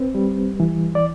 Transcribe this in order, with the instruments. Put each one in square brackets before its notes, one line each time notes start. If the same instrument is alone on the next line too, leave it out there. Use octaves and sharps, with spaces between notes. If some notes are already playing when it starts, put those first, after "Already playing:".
Already playing: [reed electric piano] C4 B4
G3
E3
D5